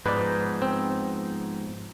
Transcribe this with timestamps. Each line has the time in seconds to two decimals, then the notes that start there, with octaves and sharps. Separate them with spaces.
0.06 G#2 F3 B3 D#4 B4 D5
0.62 C4